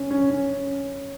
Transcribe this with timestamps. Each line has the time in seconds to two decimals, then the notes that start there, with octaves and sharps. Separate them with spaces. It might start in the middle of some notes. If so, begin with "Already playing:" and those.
Already playing: C#4
0.10 C#4
0.30 C#4